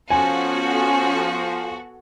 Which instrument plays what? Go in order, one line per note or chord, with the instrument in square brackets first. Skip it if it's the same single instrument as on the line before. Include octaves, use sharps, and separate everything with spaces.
[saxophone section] F3 [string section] B3 F#4 A4 [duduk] C#4 [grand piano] G#5